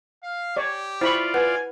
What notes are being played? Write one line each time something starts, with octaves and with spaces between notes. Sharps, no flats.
F5
G4 C#5 D5
E4 F4 C5 D5 B5 C#6
B4 F#5 G#5